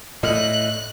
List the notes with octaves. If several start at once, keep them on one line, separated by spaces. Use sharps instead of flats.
A2 D#5 F#6